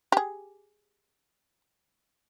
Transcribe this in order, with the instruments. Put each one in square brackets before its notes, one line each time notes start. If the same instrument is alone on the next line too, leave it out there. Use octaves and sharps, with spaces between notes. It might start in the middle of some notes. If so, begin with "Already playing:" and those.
[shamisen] G4 G#4